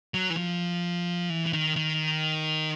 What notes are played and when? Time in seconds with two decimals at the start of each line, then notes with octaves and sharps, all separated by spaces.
0.14 F#3
0.30 E3
0.37 F3
1.30 E3
1.46 E3
1.53 D#3
1.76 D#3